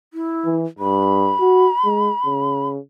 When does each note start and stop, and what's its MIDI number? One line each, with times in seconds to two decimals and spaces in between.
0.14 0.55 64
0.45 0.66 52
0.79 1.33 43
0.79 2.68 83
1.41 1.68 66
1.85 2.10 56
2.25 2.79 49